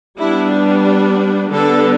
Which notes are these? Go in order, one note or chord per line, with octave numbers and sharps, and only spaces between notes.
G3 B3 D4 E4
G4
D3 G3 B3 D4 A4